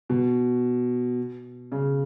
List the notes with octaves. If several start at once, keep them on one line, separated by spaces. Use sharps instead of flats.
B2
C#3